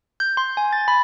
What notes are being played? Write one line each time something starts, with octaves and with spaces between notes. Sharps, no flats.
G6
C6
G#5
A6
B5